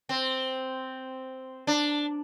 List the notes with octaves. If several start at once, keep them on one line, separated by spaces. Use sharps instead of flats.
C4
D4